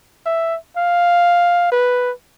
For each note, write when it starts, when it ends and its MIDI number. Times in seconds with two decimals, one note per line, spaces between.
0.26 0.57 76
0.77 1.69 77
1.72 2.12 71